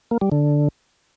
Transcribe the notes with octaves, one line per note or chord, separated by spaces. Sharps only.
A#3
G3
D3